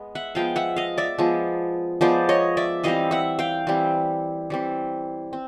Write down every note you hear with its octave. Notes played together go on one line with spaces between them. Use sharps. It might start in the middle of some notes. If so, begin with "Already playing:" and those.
Already playing: G#3 B3
E5 F#5
F3 G#3 B3 F5 G5
E5 F#5
D#5 F5
D5 E5
F3 G#3 B3
F3 G#3 B3 C5 D5
C#5 D#5
D5 E5
E3 G3 C4 D#5 F5
E5 F#5
F5 G5
E3 G3 C4
E3 G3 C4
C4